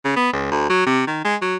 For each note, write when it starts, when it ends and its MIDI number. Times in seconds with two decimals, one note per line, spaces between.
0.05 0.12 49
0.16 0.32 59
0.33 0.47 37
0.52 0.68 38
0.70 0.85 54
0.86 1.02 48
1.07 1.23 51
1.25 1.36 56
1.42 1.56 54